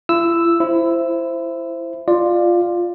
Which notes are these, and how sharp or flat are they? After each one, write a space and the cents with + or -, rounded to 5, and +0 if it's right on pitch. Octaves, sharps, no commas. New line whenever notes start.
E4 +40 E6 +0
E4 +20 C5 +0
F4 +0 D5 +20